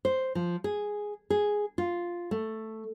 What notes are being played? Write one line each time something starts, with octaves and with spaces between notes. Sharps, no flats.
C5
F3
G#4
G#4
F4
A3